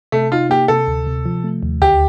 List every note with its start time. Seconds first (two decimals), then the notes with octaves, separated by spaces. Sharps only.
0.12 C3 A3
0.32 D#4 F4
0.50 A#3 G4
0.68 C3 A4
0.88 D2
1.07 C3
1.26 F3
1.44 A3
1.63 D#2
1.82 D2 G4